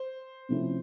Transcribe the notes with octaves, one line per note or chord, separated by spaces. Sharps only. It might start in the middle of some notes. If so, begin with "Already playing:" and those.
Already playing: C5
C3 F3 A3 C#4 E4